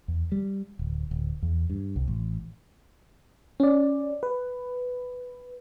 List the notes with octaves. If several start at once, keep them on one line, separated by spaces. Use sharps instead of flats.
E2
G3
D1
D1
E2
G2
C2
A1
C#4 D5
B4